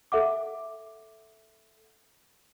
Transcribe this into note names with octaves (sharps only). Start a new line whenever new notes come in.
A4 E5 F#5 D6